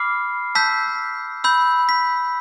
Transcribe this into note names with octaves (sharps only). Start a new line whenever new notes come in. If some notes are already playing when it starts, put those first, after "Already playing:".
Already playing: B5 D6 F6 C7
A5 E6 G6 B6
B5 E6 G6
B6